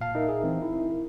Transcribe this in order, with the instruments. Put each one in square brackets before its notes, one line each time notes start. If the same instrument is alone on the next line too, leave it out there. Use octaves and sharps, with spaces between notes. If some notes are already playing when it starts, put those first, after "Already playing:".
[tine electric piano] A#2 F5 A5
[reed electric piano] D#4 A#4 E5
[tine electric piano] G#4
E3 C4
E4